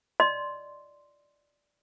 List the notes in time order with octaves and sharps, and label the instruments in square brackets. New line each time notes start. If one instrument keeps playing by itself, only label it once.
[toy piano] D5 D#5 C6